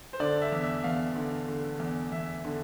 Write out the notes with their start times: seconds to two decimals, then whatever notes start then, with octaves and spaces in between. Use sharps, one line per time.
0.13 C5
0.20 D3 D5
0.42 E5
0.52 E2
0.64 E5
0.84 E2 F5
1.16 D3
1.48 D3
1.80 E2
2.12 E2 E5
2.45 D3